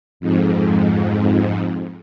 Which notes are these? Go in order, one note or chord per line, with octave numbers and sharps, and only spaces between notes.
F2 G#2